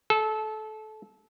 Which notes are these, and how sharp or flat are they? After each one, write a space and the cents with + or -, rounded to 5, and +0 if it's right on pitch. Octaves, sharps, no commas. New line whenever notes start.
A4 -25